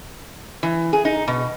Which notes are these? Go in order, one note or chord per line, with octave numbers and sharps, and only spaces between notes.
E3
G#4
D#4
B2